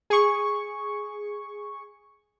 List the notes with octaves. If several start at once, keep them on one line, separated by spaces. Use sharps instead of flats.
G#4 C#6